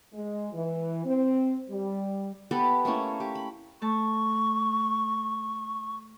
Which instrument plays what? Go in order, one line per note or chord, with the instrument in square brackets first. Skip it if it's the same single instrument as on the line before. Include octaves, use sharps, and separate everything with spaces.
[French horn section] G#3
E3
C4
G3
[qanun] B3 G4 A4 B5
A3 A#3 C#4 E4
G4
B5
[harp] A3 A5 [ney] C#6